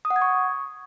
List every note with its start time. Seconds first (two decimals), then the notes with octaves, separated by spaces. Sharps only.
0.05 D#6
0.10 F#5
0.16 G#6
0.22 C#6